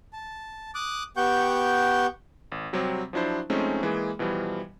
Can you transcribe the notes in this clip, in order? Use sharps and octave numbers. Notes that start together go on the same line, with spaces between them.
A5
D6 D#6 F#6
B3 G4 F#5 G5 C#6 G6
G#1
C3 F#3 G3 C4
F3 F#3 D4 E4 C5
F3 G#3 A3 C4 C#4 D#4
E3 G#3 A#3 G#4
B2 E3 F3 G3